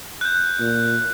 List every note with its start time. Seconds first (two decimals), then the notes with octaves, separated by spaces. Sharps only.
0.21 F#6 G6
0.60 A#2